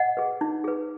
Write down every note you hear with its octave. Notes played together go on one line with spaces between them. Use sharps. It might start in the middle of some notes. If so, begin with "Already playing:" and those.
Already playing: D#5 F#5
G#4 B4
D#4
G#4 B4